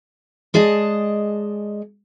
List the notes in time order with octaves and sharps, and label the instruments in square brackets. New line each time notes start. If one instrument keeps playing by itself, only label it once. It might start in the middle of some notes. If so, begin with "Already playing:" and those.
[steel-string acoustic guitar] G#3 G#4 D5 D#5 A5